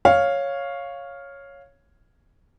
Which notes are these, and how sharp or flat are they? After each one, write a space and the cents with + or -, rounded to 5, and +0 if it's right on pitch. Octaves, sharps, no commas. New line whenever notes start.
C#5 +0 F5 +0